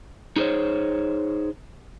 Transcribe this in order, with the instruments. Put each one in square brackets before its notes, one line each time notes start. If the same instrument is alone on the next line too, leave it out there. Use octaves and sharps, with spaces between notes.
[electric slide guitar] D#4 G#4 A#4 C5 C#5